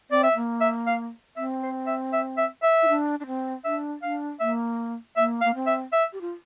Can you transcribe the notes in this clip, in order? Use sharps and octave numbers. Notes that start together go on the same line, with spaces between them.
C4 D5
E5
A#3
E5
F5
C4 E5
C5
E5
E5
E5
E5
E4
D4
D4
C4
D4 E5
D4 F5
A#3 E5
A#3 E5
F5
A#3
C4
E5
E5
G4
F4